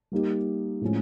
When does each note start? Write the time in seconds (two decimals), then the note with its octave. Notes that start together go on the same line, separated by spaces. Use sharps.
0.12 G3 A#3 D#4 G4
0.81 A2 F3 G#3 C#4